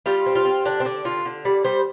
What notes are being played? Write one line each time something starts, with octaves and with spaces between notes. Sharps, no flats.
G3 F4
C4
F4
C4
D3 D4
C4
D3 D4
D3 F4
D3
G3 D5
G3 C5